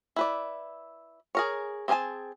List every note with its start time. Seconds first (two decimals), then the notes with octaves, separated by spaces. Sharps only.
0.16 E4 B4 D5
1.35 G#4 A#4 C#5
1.88 C4 G#4 A#4 G#5 A5